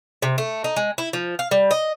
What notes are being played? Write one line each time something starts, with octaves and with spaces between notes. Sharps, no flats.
C3
A3
D#4
G#3
E4
F3
F5
G3
D#5